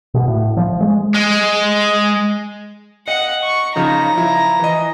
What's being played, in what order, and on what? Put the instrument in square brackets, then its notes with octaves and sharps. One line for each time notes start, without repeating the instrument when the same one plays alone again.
[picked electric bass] B2
A2
F3
G#3
[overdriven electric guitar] G#3
[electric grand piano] D#5 [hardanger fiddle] F#5
[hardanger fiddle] C#6
[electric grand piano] C#3 F3 D#4 [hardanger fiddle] A#5
[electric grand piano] F3 E4
E3 D#5